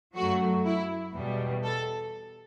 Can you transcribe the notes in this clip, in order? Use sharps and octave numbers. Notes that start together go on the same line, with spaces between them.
F#2 F#3 A3 F#4
E4
E2 B2 G3
A4